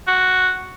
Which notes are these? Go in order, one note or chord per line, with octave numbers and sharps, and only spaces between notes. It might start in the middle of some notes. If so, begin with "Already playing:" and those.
F#4